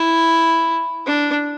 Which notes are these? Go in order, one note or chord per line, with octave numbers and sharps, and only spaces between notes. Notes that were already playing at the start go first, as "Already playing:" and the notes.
Already playing: E4
D4